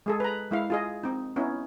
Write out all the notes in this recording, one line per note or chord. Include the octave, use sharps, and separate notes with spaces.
G#3 G#4 A4
B4 A#5
G#3 E4 F5
F4 G#4 D#5
C4 D#4
B3 C#4 D#4 E4